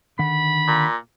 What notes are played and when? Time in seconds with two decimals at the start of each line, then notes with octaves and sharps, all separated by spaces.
0.19 D3 D#3 F#5 B5
0.68 A#2